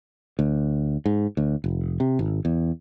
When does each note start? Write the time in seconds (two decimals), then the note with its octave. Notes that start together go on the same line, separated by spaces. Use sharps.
0.39 D2
1.06 G#2
1.37 D2
1.64 F1
2.00 C3
2.19 G#1
2.45 E2